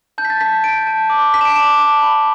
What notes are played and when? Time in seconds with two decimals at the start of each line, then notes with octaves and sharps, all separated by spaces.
0.18 A5 G6
0.25 B6
0.30 A6
0.41 A5 B6
0.64 G6 D7
0.87 A5
1.10 D6
1.34 A5 B6
1.41 E7
1.45 D7
1.56 D6 E7
1.79 A5
2.03 B5